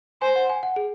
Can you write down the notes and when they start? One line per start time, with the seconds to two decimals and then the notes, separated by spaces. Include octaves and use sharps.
0.22 C5 G#5
0.36 F#5
0.50 G#5
0.63 F#5
0.76 G#4